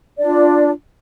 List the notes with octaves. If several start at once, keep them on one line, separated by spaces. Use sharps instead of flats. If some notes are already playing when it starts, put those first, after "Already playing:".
D4 F4 D5